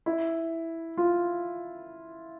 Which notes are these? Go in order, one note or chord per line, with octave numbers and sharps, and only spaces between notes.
E4
F4